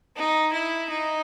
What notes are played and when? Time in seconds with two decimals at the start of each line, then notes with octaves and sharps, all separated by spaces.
0.16 D#4
0.53 E4
0.90 D#4